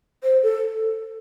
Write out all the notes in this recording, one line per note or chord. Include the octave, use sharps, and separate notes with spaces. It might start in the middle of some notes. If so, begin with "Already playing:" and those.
C5
A4